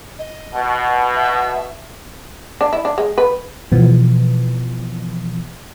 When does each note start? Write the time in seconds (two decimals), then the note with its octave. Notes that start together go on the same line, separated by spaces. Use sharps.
0.19 D#5
0.54 B2
1.16 E5
2.61 D4
2.73 E4
2.85 D4
2.98 G#3
3.18 B4
3.72 B2 E3 F3 B3